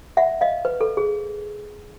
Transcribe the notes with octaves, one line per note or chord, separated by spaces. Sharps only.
E5 F#5
D#5 F5
B4
A4
G#4